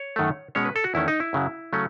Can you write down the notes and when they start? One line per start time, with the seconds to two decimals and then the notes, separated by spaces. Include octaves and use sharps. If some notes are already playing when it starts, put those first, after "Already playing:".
Already playing: C#5
0.16 F#2 D#3 A3
0.55 B2 G#3 C#4 C#5
0.65 B4
0.76 A4
0.84 F#4
0.94 E2 D#3 A3 C#4 E4
1.08 D#4
1.20 E4
1.33 F#2 C#3 F#3
1.73 C#3 F#3 A3 C#4